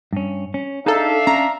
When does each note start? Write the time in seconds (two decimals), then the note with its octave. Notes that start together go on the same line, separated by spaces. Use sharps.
0.13 G2 C#4
0.54 C#4
0.86 D4 D#4 G#4 A4 E5 F5 A5
1.27 C#4 A#5